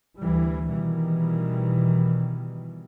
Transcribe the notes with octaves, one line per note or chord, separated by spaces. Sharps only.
D2 E3 G3
B2 D#3 E3 G3